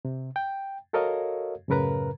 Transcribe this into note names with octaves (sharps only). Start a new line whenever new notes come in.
C3
G5
F#4 A4 A#4 C#5 D#5 F5
F#2 A2 C#3 A#4 B4 A#5